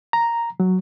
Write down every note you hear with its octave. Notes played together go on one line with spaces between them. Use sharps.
A#5
F#3